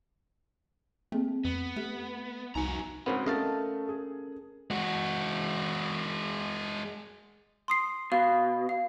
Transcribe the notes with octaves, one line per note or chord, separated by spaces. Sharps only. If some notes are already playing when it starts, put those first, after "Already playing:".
A3 A#3 C4 G#4
F2 B3
A3 G4
C2 F2 D#4 F#4 G#5 A#5
G#2 C#3 B3 C4 F#4 A#4
A3 C#4 A4 A#4 D#5 F5 A5
G#4
G#3 F#4
C6 D#6 C7
B2 F5
F5